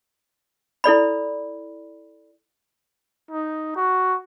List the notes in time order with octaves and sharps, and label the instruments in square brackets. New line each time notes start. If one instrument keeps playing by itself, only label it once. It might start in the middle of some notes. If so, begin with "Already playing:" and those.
[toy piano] E4 A4 D5 B5
[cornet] D#4
F#4